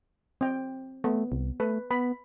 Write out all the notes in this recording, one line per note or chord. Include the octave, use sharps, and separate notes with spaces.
C4 G5
A3 B3
C2
A3 B4
B3 B5